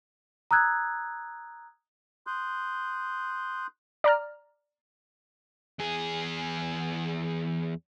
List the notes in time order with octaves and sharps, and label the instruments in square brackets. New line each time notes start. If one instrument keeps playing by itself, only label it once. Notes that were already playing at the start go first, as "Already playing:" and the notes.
[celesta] A#5 D#6 E6 F#6 G#6
[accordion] C6 D#6 F#6 G6
[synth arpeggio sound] D5 A#5 F6
[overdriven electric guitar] E2 G#4